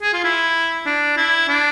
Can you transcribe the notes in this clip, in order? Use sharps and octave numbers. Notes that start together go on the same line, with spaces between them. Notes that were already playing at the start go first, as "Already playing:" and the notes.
G#4
F4
E4
D4
E4
D4